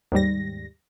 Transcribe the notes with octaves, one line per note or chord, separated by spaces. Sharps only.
D#2 G#2 G3 A#6